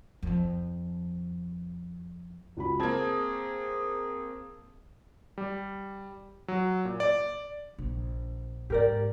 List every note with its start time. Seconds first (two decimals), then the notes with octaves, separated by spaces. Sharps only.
0.23 F2 F3
2.57 C#2 F#4 B5
2.80 A#3 C4 G#4 A5 G#6
5.38 G3
6.48 F#3
6.85 A#2
7.00 D5
7.78 A#1
8.70 G#2 G4 A#4 D5